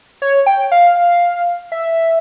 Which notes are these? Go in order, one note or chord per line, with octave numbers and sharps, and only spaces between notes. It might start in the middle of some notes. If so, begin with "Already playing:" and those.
C#5
G5
F5
E5